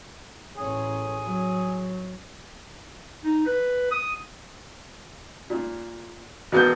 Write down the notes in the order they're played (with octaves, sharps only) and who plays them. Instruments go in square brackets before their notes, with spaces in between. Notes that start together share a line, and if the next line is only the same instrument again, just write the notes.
[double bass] A1 C#4 [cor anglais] G#4
[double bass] F#3
[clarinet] D#4
B4
D#6
[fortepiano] A#2
[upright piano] E1 B3 G6 [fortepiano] B2